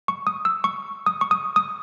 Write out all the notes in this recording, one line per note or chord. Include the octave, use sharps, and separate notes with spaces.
C#6
D#6
E6
C#6
D#6
C#6
D#6
D#6